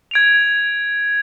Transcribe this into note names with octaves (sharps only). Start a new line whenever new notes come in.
G#6 D7 F7